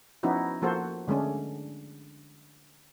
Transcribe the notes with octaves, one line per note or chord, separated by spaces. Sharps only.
F3 B3 C#4 D#4 E4 F#4
F3 A#3 F#4 A4 C5
D3 G#3 A3 C#4 D4